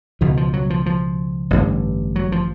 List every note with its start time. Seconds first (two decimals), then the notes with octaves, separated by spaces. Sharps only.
0.21 C#2 B2 F3
0.37 F3
0.53 F#3
0.70 F3
0.86 F3
1.50 A1 G2 D3
2.16 F#3
2.32 F3